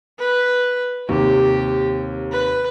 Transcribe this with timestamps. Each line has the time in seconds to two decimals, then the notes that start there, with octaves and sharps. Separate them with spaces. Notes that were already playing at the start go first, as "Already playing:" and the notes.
0.19 B4
1.09 D#2 C3 G4
2.31 B4